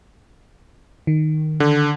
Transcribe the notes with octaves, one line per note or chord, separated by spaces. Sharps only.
D#3
D3